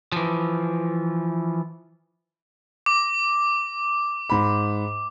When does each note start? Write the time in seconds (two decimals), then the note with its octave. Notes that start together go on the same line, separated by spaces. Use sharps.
0.12 E3 F3
2.86 D6
4.30 G#2 B5